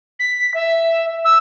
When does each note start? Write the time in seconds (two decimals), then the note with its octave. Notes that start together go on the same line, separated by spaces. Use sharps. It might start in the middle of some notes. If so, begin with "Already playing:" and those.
0.20 B6
0.54 E5
1.25 E6